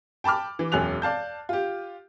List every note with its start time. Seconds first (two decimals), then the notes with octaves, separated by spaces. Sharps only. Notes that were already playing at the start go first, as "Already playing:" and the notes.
0.24 G5 A5 B5 D6 F6
0.59 E3
0.72 E1 F#2 G#5 F#6 F7
1.02 D5 F5 A5 G6
1.49 F4 G4